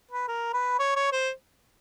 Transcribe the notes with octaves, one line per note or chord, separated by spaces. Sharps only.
B4
A#4
B4
C#5
C#5
C5